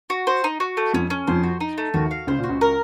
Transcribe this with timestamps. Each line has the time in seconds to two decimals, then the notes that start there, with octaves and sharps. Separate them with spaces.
0.10 F#4
0.27 C5
0.44 D#4
0.60 F#4
0.77 A3
0.94 F2 F3 C#4
1.10 C#4
1.27 F2 F3 C5
1.43 F#4
1.60 D#4
1.78 A3
1.94 D#2 D#3 F#4
2.11 F5
2.27 C#2 C#3 C5
2.39 A#2
2.44 F#4
2.49 C#2 C#3
2.61 A#4